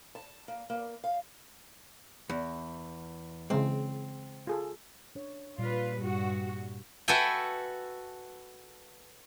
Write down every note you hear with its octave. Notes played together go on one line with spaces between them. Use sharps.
A5
A#3
A#3
F5
E2
C#3 E3 G#3 C4
F4 G#4 A4
D4 C#5
A#2 G3 F4 B4 D5
G2 F#4
F#4 A4 B4 E5 G5 G#5